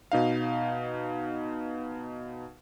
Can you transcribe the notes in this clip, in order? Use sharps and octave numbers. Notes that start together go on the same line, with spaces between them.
B2 D#4 F5